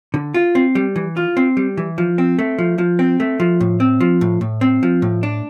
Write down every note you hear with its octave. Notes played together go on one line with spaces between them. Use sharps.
D3
F4
C4
G3
E3
F4
C4
G3
E3
F3
C4
A3
F3
F3
C4
A3
F3
A2
C4
F3
A2
A2
C4
F3
A2
D4